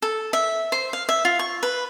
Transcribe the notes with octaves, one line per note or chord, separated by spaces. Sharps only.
A4
E5
C5
F5
E5
F4
C#6
B4